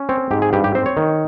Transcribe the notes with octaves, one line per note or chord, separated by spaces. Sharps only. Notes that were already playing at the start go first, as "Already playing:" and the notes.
Already playing: C#4
C4 C#5
G#2 G4
G#4
G2 G4
G4
C4 C5
C#5
D#3